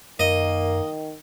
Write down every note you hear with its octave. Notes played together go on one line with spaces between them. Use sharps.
F#2 D#3 A#3 D#5